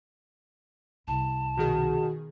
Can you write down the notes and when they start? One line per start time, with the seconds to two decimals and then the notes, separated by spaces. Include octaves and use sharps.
1.08 C2 A5
1.58 B2 D#3 F#4 G#4